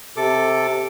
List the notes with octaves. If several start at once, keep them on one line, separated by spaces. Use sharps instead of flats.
C3 A4 D6